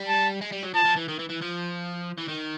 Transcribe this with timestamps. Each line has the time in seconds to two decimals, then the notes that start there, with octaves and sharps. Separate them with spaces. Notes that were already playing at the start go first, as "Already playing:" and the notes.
Already playing: G3
0.09 A5
0.42 G#3
0.52 G3
0.63 F#3
0.74 F3 A5
0.85 F3
0.96 E3
1.08 D#3
1.19 E3
1.29 E3
1.41 F3
2.18 E3
2.29 D#3